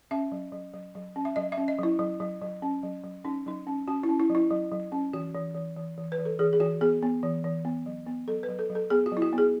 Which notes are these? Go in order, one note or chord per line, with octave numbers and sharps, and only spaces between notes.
C#4 E5
F#3
F#3
F#3
F#3
C#4
E5
F#3 D#5
E5
C#4
D#5
F#3 E4
F#3
F#3
F#3
C#4
F#3
F#3
C#4 D#4
F#3 D#4
C#4
C#4 F#4
E4
C#4
E4
F#3
E4
F#3
F#3
C#4
E3 F#4
E3
E3
E3
E3
B4
E3
A4
E3 G#4
G#4
E3 F#4
B3 G#4
B3
E3
E3
B3
F#3
B3
F#3 A4
B4
F#3
A4
F#3
A4
B3 G#4
F#4
F#3
E4
F#4
B3
G#4